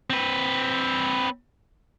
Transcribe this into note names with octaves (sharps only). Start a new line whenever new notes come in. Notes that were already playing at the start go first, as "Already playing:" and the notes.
C4 B4